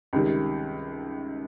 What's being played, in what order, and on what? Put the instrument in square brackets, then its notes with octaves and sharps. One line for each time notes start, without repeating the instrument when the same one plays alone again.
[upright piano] C#2 C3 D#3 G3